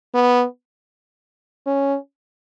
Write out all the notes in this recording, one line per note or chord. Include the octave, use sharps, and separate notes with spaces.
B3
C#4